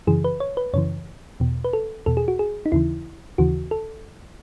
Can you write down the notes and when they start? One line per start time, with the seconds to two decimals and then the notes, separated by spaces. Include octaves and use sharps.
0.07 F#2 C#3 E3 G#4
0.24 B4
0.40 C#5
0.57 B4
0.74 F#2 C#3 E3 C#5
1.40 E2 B2
1.64 B4
1.73 A4
2.06 E2 B2 A4
2.17 G#4
2.28 F#4
2.39 G#4
2.66 D#4
2.72 D#2 C#3 E3 E4
3.38 D#2 C#3 E3 F#4
3.71 A4